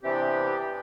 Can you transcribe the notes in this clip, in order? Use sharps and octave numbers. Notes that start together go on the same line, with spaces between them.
C3 E3 B3 C4 D4 G4